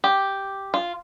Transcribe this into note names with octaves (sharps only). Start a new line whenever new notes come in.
G4
F4